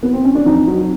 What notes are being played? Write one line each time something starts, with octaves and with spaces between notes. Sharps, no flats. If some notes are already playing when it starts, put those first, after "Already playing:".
B3
C4
C#4
D4
F2 D#4
F#3